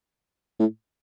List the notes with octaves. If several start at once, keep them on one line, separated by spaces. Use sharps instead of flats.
A2